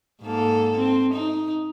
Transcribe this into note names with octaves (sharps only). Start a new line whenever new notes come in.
G#2 A#3 A4
C4
D#4